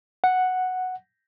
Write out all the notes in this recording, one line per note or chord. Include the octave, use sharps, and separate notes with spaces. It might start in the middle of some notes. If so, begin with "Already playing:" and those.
F#5